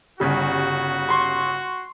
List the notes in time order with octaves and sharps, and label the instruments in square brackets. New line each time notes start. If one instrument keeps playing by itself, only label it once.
[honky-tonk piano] G1 C#3 G3 [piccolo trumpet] F#4
[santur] C6 C#6